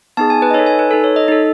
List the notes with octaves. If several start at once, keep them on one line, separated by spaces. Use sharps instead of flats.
B3 D#4 G#4 A5
G#5
B4
D#5
D#4 A4 C#5
G#5
B4
D#4 A4
C#5
D#5
D#4 A4